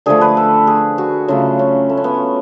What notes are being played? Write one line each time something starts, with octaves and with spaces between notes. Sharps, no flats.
D3 F3 A3 G#4
B4
A4
G#4
F#4
C#3 F#3 A3 F4
C#4
A3
C#4
B3